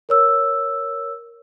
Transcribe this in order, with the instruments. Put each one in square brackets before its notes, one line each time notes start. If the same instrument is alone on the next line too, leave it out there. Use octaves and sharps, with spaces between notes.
[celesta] A#4 C#5 E6